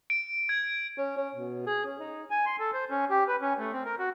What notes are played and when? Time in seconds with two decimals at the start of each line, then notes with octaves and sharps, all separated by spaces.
0.10 D7
0.49 G#6
0.98 C#4
1.17 C#4
1.35 B2
1.67 G#4
1.85 C#4
2.00 D#4
2.30 G#5
2.46 C6
2.60 A4
2.74 C5
2.90 C#4
3.10 G4
3.28 B4
3.41 C#4
3.58 A3
3.73 C4
3.85 A#4
3.99 F#4